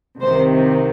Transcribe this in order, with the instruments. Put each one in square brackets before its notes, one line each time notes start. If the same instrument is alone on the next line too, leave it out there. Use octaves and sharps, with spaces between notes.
[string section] C2 C3 D#3 C5